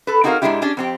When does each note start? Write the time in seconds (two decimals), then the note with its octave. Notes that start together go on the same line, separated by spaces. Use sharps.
0.07 A4 B4
0.24 C4 D#4 F#4 G#4 A#4 F5
0.42 G#2 E3 G#3 D4 E4 G4
0.62 C#4 D4 G4 G#4 D5
0.77 F2 C4 G4